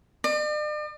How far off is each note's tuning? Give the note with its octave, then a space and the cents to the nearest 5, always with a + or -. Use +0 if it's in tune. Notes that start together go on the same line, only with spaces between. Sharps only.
D5 +45